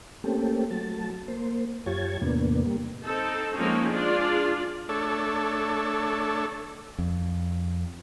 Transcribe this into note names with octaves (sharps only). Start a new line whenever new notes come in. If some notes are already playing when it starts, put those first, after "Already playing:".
A3 A#3 C4 C#4 G4 A4
F#3 A3 A5
A#3 C5
F#2 F4 G4 C#5 A5 G#6
E2 A2 C3 A#3 B3 D4
G3 A#3
C4 D#4 A4
F3 G#3 A#3 C4 C#4 D#4
D4 F4 G#4 D5
A3 D4 A4 C#5
F2